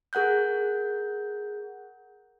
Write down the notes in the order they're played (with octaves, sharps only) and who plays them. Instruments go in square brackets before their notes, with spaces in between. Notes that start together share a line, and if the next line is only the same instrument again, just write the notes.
[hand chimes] G#4 A#4 F#5 F#6 G6